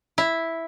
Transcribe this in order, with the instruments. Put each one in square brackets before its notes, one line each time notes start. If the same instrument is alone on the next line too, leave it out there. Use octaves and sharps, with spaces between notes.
[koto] E4